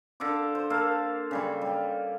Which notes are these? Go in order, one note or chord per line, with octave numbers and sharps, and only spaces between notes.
D3 A4 F5 D6
C5
A#3 A4 F5
C#3 G3 C#5
G3